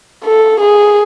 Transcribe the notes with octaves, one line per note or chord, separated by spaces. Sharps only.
A4
G#4